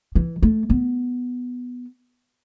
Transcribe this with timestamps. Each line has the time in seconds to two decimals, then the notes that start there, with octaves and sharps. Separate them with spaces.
0.15 E3
0.42 A3
0.70 B3